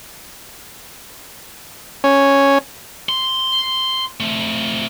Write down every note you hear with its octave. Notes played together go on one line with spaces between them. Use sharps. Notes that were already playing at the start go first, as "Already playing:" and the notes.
C#4
C6
A3 C4